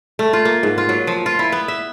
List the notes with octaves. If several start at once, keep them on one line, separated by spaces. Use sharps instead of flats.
A3
F4
A#3
G#2
F4
F#3
F3
F4
E4
B3
E5